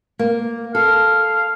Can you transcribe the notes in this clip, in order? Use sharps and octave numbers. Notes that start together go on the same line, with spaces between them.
A#3
A4 F5